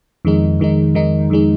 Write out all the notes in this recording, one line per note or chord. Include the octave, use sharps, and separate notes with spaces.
F2 D#3 G#3 D#4
F2 D#3 G#3 D#4
F2 D#3 G#3 D#4
F2 D#3 G#3 D#4